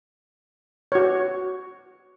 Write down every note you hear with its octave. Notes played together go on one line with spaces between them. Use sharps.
F#4 C#5